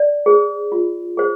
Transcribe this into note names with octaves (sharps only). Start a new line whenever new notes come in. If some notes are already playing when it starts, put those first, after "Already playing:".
Already playing: D5
G#4 C5
F4
G#4 C5